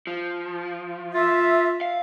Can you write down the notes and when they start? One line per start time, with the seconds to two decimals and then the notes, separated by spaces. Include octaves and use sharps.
0.07 F3
1.13 F4 E5
1.81 F5